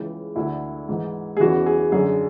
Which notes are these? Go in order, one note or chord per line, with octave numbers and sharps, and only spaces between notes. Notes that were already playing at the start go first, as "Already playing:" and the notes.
Already playing: C#2 C#3 E3
D2 D3 E4
G#2 E3
G#4
E2 C#3 E3 F#4
G#4
F#2 D3 G#4